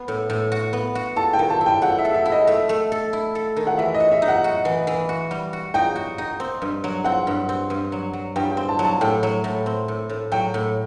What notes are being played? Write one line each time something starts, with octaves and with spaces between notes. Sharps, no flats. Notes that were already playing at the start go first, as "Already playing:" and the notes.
Already playing: B3
A2
A2
F#4
B3
F#4
A4 A5
G5
D#3
A5
E4
G5
A3 F#5
E5
A4
E5
E4
D#5
A3 E5
A3
A4
E4
A4
D#3
F#5
E3 E5
D#5
F#4
E5
D#4
F#5
F#4
E3
E3
F#4
G3
F#4
D#4 G5
F#4
D#4
C4
G2
F#3
C4 F#5
G2
C4
G2
F#3
F#3
G2 G5
G5
C4
A5
F#3
A5
A2 G5
F#3
A2
C4
A2
A2
F#3 G5
A2